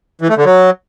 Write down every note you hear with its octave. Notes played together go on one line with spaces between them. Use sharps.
E3
A3
D3
F#3